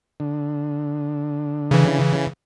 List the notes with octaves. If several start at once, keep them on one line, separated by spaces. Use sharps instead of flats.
D3
C#3 E3